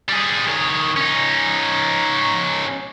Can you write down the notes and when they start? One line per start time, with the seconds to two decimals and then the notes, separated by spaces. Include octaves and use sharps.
0.09 G3 G#4
0.48 D#3 C#5
0.97 C#4 D#4